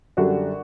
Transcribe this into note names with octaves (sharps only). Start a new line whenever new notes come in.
F#2 D3 G3 D4 F#4